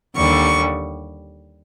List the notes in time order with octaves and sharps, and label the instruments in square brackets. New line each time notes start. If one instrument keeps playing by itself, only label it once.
[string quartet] D#2 D3 G3 C#6